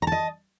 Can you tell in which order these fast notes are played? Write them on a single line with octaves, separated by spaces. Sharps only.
A#5 A5 D#5